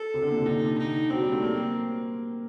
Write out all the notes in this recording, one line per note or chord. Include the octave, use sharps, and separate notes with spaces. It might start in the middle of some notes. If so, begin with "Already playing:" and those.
Already playing: A4
C3
D3
A#2
C3
D3 D#4
D#4
F#3 C4
G3
A3
A#3